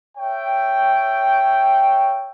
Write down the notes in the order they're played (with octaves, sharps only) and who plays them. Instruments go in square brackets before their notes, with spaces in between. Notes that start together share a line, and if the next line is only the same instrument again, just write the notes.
[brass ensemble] C#5 E5 G5